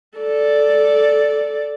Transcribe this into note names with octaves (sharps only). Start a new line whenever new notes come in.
A4 D5